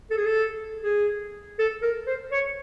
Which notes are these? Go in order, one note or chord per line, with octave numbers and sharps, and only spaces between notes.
A4
G#4
A4
G#4
A4
A#4
C5
C#5